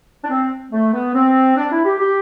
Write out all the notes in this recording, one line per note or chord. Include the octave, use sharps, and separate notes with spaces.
D4
C4
A3
B3
C4
D4
E4
G4
G4